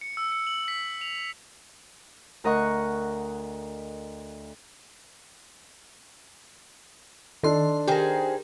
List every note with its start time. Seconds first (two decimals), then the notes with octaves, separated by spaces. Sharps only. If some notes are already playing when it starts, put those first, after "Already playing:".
0.01 C#7
0.17 E6
0.32 C#7
0.47 F#7
0.68 B6
1.01 F7
2.44 D2 A#4 D#5 F#5 C#6 F#6
7.43 D#3 D4 A4 C6
7.88 D#3 G4 G#4 A#4 C5